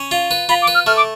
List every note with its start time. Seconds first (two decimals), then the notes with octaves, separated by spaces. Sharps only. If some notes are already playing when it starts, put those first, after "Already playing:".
Already playing: C#4
0.11 F4
0.31 B4
0.49 F4 B5
0.62 D6
0.68 B4
0.74 F6
0.86 A3 F6
0.97 D6